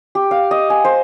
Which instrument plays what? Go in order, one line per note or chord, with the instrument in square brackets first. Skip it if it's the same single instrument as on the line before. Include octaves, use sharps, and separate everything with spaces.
[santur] G4
F5
D#5
G#5
C5